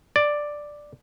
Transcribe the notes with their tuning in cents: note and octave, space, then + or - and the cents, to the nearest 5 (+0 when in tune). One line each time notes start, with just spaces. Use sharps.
D5 +5